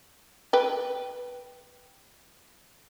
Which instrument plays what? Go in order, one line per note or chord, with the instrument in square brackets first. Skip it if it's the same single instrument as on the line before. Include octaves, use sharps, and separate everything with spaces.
[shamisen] B4 G5